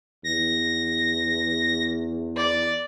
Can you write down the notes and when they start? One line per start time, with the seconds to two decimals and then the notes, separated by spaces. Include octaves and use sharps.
0.24 E2 A#6
2.36 D5